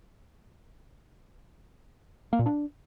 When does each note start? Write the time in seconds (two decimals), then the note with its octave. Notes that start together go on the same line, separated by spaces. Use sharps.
2.33 A#3
2.39 A#2
2.46 D4